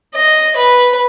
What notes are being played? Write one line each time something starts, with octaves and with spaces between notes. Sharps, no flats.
D#5
B4